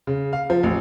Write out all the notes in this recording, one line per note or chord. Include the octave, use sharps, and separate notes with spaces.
C#3
F5
F3
A1